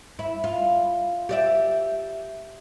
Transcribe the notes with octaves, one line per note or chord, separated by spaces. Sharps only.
E4
F4
G4 D5 E5